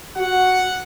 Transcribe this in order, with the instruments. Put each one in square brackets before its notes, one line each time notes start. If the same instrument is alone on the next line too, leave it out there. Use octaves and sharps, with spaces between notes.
[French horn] F#4 [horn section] F#5